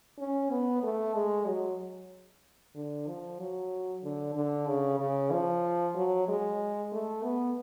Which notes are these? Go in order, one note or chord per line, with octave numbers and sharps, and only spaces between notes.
C#4
B3
A3
G#3
F#3
D3
F3
F#3
D3
D3
C#3
C#3
F3
F#3
G#3
A3
B3